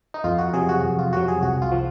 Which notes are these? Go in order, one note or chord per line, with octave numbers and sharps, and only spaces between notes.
D#4
F2 F4
F#4
C3 F#3 G#4
F#4
F2
F4
C3 F#3 F#4
G#4
C2 F#4
F4
F3